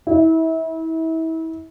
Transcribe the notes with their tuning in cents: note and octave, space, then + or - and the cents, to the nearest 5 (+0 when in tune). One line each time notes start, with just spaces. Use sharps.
E4 -30